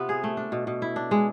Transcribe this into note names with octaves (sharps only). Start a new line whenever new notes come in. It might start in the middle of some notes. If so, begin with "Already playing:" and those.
Already playing: C3 B3 F4
G#4
A3
D4
B2
B2
E4
D4
G#3